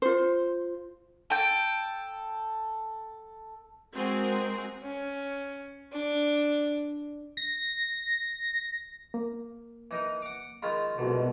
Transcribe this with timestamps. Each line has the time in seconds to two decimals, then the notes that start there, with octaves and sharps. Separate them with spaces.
0.02 F4 C5
1.30 A4 G5
3.94 G#3 C4 F#4 G#4 A#4
4.83 C#4
5.93 D4
7.37 A#6
9.14 A#3
9.91 E3 D#4 A#4
10.22 F#5 D6
10.63 D#3 G#3 F4 B5 F6
10.98 C2 G#2 B2 F4 A4 A#4